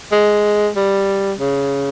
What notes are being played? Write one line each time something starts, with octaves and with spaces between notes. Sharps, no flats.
G#3
G3
C#3